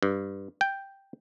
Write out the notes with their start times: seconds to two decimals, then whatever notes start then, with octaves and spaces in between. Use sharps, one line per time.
0.03 G2
0.61 G5